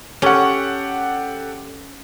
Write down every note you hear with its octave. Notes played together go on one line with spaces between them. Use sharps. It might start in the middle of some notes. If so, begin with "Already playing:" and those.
C#4 G4 A4 F#5